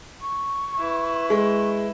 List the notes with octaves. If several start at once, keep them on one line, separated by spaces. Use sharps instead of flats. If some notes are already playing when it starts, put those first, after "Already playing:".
C#6
E4 B4
G#3